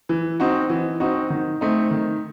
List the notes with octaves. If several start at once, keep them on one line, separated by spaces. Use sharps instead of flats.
E3
C4 D#4 F#4
E3
C4 D#4 F#4
D#3
A3 C4 D#4
D#3